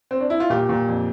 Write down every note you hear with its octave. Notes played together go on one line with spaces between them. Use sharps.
C4
D4
E4
F4
A#2 G4
A#2
F2